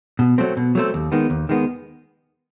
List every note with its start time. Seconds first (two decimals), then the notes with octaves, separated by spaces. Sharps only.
0.19 B2
0.38 F#3 A3 C4
0.57 B2
0.75 F#3 A3 C4
0.94 D#2
1.12 D#3 G#3 B3
1.30 D#2
1.49 D#3 G#3 B3